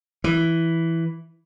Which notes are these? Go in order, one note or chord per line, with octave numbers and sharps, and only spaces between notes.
E3